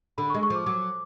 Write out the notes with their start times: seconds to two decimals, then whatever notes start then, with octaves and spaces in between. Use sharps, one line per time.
0.18 D3 B5
0.30 C#6
0.34 G#3
0.43 C#6
0.50 F3 D6
0.66 F#3 D6